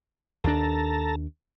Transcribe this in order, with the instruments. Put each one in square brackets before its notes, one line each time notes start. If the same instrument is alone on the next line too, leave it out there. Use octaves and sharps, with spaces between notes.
[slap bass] D#2 D4 [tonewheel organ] A4 A5 A#5